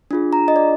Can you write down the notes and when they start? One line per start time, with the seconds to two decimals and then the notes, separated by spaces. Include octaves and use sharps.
0.11 D4 F4 G#4
0.33 A#5
0.48 D#5
0.56 D5